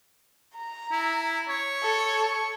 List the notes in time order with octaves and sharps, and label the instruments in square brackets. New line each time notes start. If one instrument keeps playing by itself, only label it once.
[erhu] A#5
[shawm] E4
C#5
[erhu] A4
[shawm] C#6